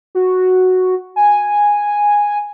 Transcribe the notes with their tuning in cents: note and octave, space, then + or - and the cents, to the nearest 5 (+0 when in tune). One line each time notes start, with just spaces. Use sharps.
F#4 -5
G#5 -5